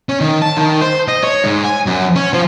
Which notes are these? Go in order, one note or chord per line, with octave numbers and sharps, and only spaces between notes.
C#4
D#3
A5
D#3
C5
D#5
C#5
G#2
G#5
F#2
C#4
F3